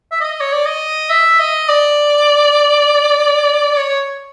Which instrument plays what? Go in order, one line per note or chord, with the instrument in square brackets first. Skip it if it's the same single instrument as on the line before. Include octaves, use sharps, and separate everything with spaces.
[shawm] E5
D#5
C#5
D5
D#5
E5
D#5
D5
C#5